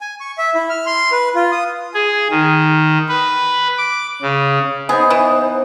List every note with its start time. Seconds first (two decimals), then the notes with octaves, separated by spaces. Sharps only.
0.01 G#5
0.20 C#6
0.38 E5
0.55 E4
0.70 F6
0.86 C6
1.12 B4
1.35 F4
1.52 D#6
1.94 G#4
2.30 D#3
3.09 B4
3.78 D6
4.22 C#3
4.89 B3 D#4 G#4 C5
5.10 E3